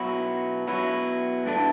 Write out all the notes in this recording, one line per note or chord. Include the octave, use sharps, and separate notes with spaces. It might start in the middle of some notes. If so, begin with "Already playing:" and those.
Already playing: B2 F#3 B3 E4
B2 F#3 B3 E4
G2 E3 A3 D4